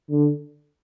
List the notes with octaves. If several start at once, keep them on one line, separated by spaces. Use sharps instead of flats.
D3